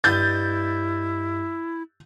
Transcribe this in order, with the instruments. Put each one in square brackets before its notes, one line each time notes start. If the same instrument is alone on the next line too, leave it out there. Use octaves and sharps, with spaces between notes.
[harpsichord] G2 D#5 [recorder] E4 [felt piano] G6 A6